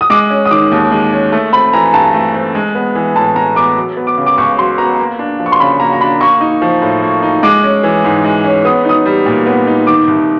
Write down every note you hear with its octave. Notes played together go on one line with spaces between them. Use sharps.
D#6
G#3 D6
C#4
D#6
D#3 D6
D#2
G#3
C#4
A3
C4 B5
E3 A#5
G2 A5
A3
C4
G#3
B3
E3
A2 A5
G#3 A#5
B3 D6
F#3
B3
D6
C#3
D6
C#2 C#6
F#3 C6
B3 A#5
A#3
D4
F3
C#6
C6
C#3 B5
A#3 A#5
A#5
D4 B5
A#3 C#6
D#4
F3
A2
A#3
D#4
G#3 D6
C#4
E3
G#2
G#3
C#4
B3 D#6
D#4 D#6
G3
A#2
B3
D#4
D#3 D6
C2